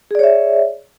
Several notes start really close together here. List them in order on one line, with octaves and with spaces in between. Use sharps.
G#4 D5 C#5 E5